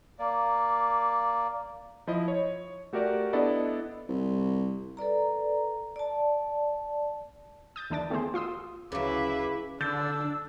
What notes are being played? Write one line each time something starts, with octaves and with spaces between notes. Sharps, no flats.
A#3 D5
F3 E4 D#5
C#5
A3 F#4 G4 A#4 D5
B3 D4 E4 A4 D5 D#5
C2
A4 B4 D5 A#5
D5 A5
D#6 G6 A6
D#2 E3 D4 D6 A6
D#3 A3 B3 G#4 C5
F4 C6 D#6 E6
D2 C#3 F#3 E4 B4 E5 F5 D6
D3 D4 E6 G6 A6